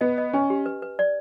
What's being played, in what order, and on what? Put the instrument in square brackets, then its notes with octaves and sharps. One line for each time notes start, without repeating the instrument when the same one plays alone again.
[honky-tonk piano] B3 [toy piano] D#5
[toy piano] D#5
[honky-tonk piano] C#4 [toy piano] G#5
[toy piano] G4
B4
B4
D5